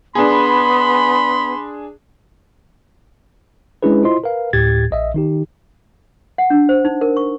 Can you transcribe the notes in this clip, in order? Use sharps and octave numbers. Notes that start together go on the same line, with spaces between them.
B3 D4 G#4 B5 C6
G#3 C#4 D4 E4 G#4 B4
E4 F4 C5 D#5 C6
A#4 B4 F5
D2 A2 G4 G#6 A6
A#1 D#5 E5
D#3 D#4 G4
F#5
D4
C5
D#4
A#4
C#6